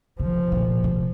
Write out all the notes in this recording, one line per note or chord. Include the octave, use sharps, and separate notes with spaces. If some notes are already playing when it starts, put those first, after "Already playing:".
C3 F3
A#2
C3